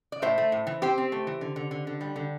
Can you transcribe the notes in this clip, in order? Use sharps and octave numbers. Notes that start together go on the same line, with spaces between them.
D5
A2 C5 E5
A3
A2
E3
C4 G4 C5
C4
A3
E3
D3
D3
D3
D3
G3
D3